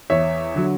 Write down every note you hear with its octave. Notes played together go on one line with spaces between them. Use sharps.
E2 C#5 E5
D3 F#3